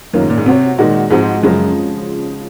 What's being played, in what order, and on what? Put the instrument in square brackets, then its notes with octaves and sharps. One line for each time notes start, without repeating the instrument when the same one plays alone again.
[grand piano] F#2 [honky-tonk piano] D#3 A#3 C#4 F4
[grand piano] G#2
A#2
G#2
[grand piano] C3 [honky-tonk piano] C4 F#4 C#5
[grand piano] A#2 [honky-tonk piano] D#3 G#3 D#4 F#4
[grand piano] G#2 [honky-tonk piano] F3 G#3 C4 D#4 F#4
[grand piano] F#2 [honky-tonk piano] C#3 F3 G#3